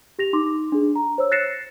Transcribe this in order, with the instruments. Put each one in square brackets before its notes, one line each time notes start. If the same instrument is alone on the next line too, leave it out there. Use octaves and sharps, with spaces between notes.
[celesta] G4 A#6 F7
D#4 C6 D6
D4 G#4
A#5
C5 C#5 E6
F#6 A6 A#6 C7 C#7 E7